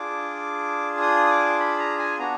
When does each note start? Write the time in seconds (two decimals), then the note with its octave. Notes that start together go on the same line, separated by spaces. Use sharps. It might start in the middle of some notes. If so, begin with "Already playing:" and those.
Already playing: D4 F4 G#4 D6
1.01 D#6
1.26 D#6
1.31 D6
1.60 B5
1.79 A#5
1.99 G#5
2.19 B3 D4 F#4 A#5